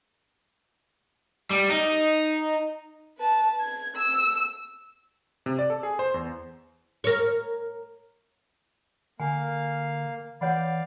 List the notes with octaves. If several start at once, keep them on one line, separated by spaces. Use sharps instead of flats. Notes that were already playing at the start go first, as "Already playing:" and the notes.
G3
D#4
B4 A5
G#6
E6
C3
D5
A4
G#4
C5
E2
A#4 C#5
D3 A#3 F5 G#5
E3 C#5 D5 F5 F#5 B5